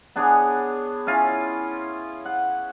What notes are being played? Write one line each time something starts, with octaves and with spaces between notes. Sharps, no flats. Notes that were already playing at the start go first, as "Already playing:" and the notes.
B3 D4 G#4 C#5
C#4 E4 F4
F#5